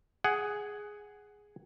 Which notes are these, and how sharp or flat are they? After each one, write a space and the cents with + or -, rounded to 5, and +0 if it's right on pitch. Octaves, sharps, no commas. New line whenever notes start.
G#4 +0 F#5 +15